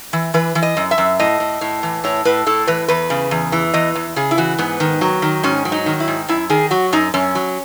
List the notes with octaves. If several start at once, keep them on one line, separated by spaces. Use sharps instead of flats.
E3
E3 B4
E3
D#5
F#2
E5
F#2
A2 D#5
A2
A2
E3
A2 C#5
A2 B4
A2 A4
E3 B4
E2 B4
C#3
E2
E3
E2 D#5
E2
C#3 G#4
E4
E3 F#4
G#2 B3
D#3
F#3
D#3
G#2 C#4
F#3
D#4
D#3
E4
G#2
F#2 E4
D#3 G#4
F#3 F#4
F#2 D#4
F#2 C#4
F#3